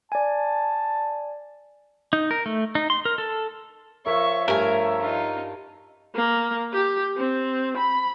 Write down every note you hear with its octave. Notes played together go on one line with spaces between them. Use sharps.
D5 G#5 A5
D#4
A#4
A3
D#4
C6
A#4
A4
F3 A#4 C#5 E5 C#6
G2 A3 A#4 G#5
D#4 F4
A#3
G4
C4
B5